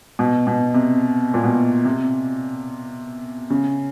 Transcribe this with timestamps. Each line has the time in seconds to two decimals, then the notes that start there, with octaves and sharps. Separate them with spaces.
0.19 B2
0.47 B2
0.74 C3
1.34 A#2
1.44 B2
1.85 C3
3.50 C#3